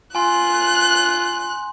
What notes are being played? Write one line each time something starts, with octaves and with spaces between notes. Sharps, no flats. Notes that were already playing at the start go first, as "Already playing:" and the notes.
F4 G#5 C6 F#6